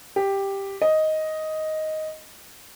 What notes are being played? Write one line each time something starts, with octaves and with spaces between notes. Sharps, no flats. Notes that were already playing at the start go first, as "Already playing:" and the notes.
G4
D#5